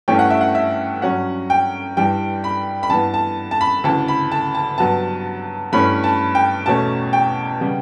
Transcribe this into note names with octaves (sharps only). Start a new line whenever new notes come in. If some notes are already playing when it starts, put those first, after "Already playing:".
G2 E3 A3 C#4 G5
F#5
E5
F#5
E5
G2 F#3 C#4 F#5
G5
G2 E3 G3 G5
B5
B5
G2 E3 B3 A5
A5
A5
B5
D2 C#3 E3 A5
B5
A5
A5
G2 F#3 B3 A5
G2 E3 A3 C#4 B5
A5
G5
E2 B2 A3 C#4 A5
G5
C#3 G3 B3